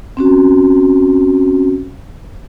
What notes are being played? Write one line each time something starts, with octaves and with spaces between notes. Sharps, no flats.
C4 C#4 F#4